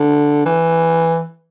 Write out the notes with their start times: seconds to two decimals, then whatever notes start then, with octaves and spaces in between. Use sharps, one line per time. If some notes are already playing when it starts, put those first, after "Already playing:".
Already playing: D3
0.46 E3